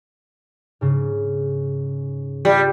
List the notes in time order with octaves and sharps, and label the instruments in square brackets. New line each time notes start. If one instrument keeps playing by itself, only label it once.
[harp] G#2 C#3
[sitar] G3 [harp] F4 D5 E5